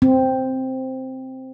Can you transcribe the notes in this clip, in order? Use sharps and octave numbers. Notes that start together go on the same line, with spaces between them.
C4